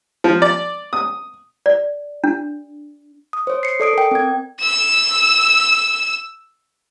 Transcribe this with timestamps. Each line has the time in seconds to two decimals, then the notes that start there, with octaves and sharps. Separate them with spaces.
0.24 F3
0.42 D5
0.93 D#6
1.66 D5
2.24 D4
3.33 D#6
3.47 C5 C#5
3.63 C7 C#7
3.80 A4 D5 D#6 D7
3.93 A#4 G5
4.11 C4 G#6
4.60 E6 E7